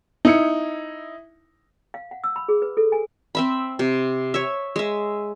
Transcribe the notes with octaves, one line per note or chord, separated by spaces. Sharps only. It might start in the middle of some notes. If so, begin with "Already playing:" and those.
D#4 E4 C#7
F5
F#5
E6
B5
G#4
B4
A4
G#5
C4 E5 B5
C3
C#5 E5
G#3 E5